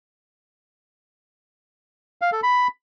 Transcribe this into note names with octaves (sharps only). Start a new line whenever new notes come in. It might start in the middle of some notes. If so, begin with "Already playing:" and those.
F5
A4
B5